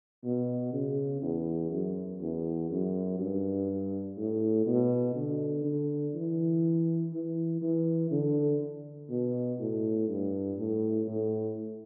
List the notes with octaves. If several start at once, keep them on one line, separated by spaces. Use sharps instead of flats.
B2
C#3
E2
F#2
E2
F#2
G2
A2
B2
D3
D3
E3
E3
E3
D3
B2
A2
G2
A2
A2